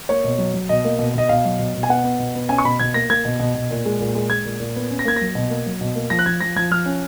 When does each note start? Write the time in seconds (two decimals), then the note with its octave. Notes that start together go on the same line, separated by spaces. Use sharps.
0.09 A#3 C#5
0.24 B2
0.38 F#3
0.54 F#3
0.69 B2 D#5
0.84 A#3
0.99 B2
1.14 B2 D#5
1.29 B2 F5
1.45 F#3
1.59 B2
1.74 B2
1.83 G#5
1.89 B3 F#5
2.04 B3
2.19 B2
2.35 B3
2.49 C#4 G#5
2.58 C#6
2.64 B2 B5
2.80 B2 G#6
2.94 A#3 A#6
3.10 A#3 G#6
3.25 B2
3.39 B2
3.55 B2
3.71 A#2
3.85 G#3
4.00 A#2
4.15 G#3
4.30 G#3 G#6
4.45 A#2
4.60 A#2
4.76 B3
4.90 C#4
4.99 A#6
5.05 A#3 G#6
5.16 F#3 A#6
5.35 B2
5.50 A#3
5.66 F#3
5.81 B2
5.95 A#3
6.10 F3 A#6
6.19 F#6
6.26 F3 G#6
6.41 F3 A#6
6.56 F3 G#6
6.71 F3 F6
6.86 C#4